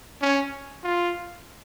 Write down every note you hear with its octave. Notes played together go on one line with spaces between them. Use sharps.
C#4
F4